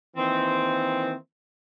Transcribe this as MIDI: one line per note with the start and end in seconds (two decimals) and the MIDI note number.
0.16 1.12 51
0.16 1.12 52
0.16 1.12 58
0.16 1.12 60